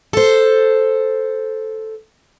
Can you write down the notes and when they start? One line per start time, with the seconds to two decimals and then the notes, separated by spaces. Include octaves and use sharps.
0.13 A4 C5